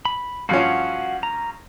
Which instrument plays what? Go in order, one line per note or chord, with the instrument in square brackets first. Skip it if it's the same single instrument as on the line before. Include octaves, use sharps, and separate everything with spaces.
[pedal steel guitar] B5
[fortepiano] G2 F3 C#4 [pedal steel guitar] F#4 F5 F#5
[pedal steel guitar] A#5